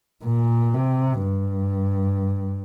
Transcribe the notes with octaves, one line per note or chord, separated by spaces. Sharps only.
A#2
C3
G2